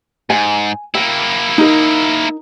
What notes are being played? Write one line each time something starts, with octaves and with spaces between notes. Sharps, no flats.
G#2 G#5
A#3 E4 G5
D#4 A#4